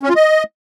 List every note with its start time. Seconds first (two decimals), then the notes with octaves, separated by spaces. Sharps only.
0.03 C#4
0.09 F4
0.16 D#5